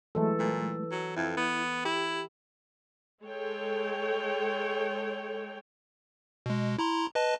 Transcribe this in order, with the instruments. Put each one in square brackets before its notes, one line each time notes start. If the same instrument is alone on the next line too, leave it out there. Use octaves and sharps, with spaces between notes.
[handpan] E3 A4 [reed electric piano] F#3 G#3 A3
[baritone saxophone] A#2
F#3
[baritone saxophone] F2 [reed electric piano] E4 G#6
[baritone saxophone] B3
[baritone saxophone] E4 [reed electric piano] G4
[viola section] G#3 A4 C#5 G5
[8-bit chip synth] B2 G#3
E4 A#5 C6
B4 D#5 A5